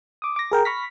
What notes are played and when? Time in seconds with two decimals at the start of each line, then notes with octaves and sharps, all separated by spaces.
0.22 D6 D#6
0.36 D6 A#6
0.52 G#4 A#4 G5 A#5
0.65 B5 C#6 F6 A#6 B6